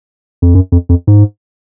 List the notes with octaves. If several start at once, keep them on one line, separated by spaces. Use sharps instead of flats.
F2
F#2
F2
F2
G#2